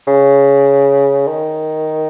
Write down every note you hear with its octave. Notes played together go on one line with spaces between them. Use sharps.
C#3
D#3